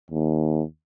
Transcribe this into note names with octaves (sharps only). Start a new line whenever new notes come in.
D#2